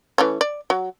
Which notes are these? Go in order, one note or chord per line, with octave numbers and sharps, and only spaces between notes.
E3 A3 C#4
D5
F#3